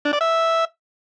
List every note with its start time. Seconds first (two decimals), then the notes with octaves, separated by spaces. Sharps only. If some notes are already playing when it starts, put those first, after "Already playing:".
0.05 D4
0.13 D5
0.21 E5